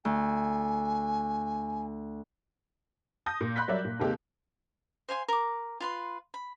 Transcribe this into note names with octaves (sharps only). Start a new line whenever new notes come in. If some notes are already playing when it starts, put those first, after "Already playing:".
D2 G#5
A5 D#6 G6 A#6
A#2
B5 C6 F#6 G6 B6
F#3 G3 A#4 C#5 D5 E5
A#2
D#2 C3 G#3 A#3 G4 A4
C5 F5 G#5 C6
A#4 D6
F4 B4 C6
B5